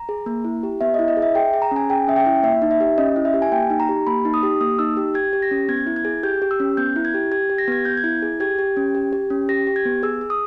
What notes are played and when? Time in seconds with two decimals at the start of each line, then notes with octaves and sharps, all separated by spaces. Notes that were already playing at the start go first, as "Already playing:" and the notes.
Already playing: A#5
0.09 G#4
0.26 A#3
0.45 E4
0.63 G4
0.81 B3 E5
0.94 E4 D#5
1.08 D#5
1.17 G#4
1.22 E5
1.35 G#4 G5
1.54 G#4
1.62 A#5
1.71 C#4 G#5
1.90 G#4 G5
2.08 C#4 E5
2.16 G5
2.26 E4
2.43 A#3 E5
2.62 D#4
2.71 E5
2.81 G4
2.98 C#4 D#5
3.16 E4
3.25 E5
3.34 G4
3.42 G#5
3.52 A#3 G5
3.70 D#4
3.80 A#5
3.89 G4
4.07 A#3 B5
4.25 D#4
4.34 D#6
4.43 G4
4.61 A#3 D#6
4.79 D#4 E6
4.97 G4
5.15 G4 G#6
5.33 G4
5.42 A#6
5.51 C#4
5.69 B3 G#6
5.87 E4
5.96 G#6
6.05 G#4
6.23 G4 G6
6.42 G4
6.51 E6
6.60 C#4
6.77 B3 G6
6.96 E4
7.05 G#6
7.14 G4
7.32 G4 G#6
7.50 G4
7.58 A#6
7.68 B3 G#6
7.85 B3 G6
7.97 G#6
8.04 E4
8.22 G#4
8.40 G4 G#6
8.59 G4
8.77 C#4
8.95 G4
9.13 G4
9.30 C#4
9.49 G4 A#6
9.67 G4
9.76 G#6
9.85 B3
10.03 G#4 E6
10.21 G#4
10.30 D#6